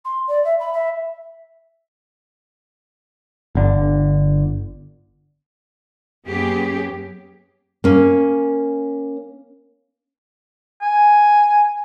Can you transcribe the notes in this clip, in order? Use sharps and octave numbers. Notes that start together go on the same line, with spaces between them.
C6
D5
E5
B5
E5
G1 D3
F#2 A#3 B3 C#4 G4 G#4
A#3 C#4
G#5